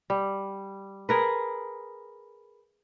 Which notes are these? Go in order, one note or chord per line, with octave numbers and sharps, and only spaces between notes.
G3
G#4 A#4 B4